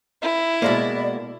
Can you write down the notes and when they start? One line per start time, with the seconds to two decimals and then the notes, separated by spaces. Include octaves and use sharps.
0.22 E4
0.62 B2 G#3 A#3 D5